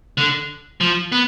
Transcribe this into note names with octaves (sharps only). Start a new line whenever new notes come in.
D3
F3
B3